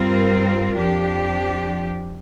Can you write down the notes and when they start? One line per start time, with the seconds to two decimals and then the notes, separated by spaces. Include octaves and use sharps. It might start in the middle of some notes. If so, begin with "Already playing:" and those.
Already playing: G2 G3 C4 F4 A#4
0.76 F2 F3 D4 G4